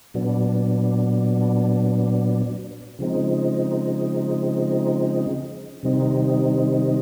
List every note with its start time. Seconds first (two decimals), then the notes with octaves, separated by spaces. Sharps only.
0.14 A#2 F#3 B3 D4
2.99 C#3 F3 G#3 C4 D#4
5.83 C3 D#3 G3 C4 D#4